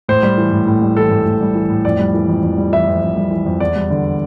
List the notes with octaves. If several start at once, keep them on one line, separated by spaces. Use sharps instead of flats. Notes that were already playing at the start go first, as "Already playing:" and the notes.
A2 C5
G3
E3
A2
A2
G3
E3 A4
A2
A2
G3
E3
A2
F2 D5
G3
E3
F2
F2
G3
E3 E5
F2
F2
G3
E3
F2
E2 D5
G3
D3